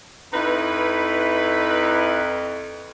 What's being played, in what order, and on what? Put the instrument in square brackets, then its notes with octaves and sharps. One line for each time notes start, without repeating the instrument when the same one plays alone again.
[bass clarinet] F2 [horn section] D#4 E4 B4